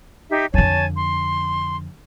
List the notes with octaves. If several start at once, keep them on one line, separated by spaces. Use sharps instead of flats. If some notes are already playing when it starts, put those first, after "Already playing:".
D#4 G4 E5
F2 D3 C#5 G#5 A5
C6